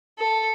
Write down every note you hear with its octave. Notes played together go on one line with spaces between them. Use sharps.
A4